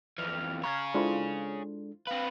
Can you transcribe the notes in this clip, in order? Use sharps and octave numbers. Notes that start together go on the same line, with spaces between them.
F2 E3 F6
G#4 C#5 F5 A#5 F6 G#6
G#3 D4 E4 F4 A4 C5
C4 B4 F5